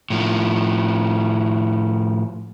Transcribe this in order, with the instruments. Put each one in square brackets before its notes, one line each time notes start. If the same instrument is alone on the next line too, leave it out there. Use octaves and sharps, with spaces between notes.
[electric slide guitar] A2 F3